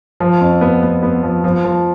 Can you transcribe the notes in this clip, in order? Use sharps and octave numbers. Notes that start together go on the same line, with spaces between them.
F3
F2
B3
B3
B3
F3
F3
F3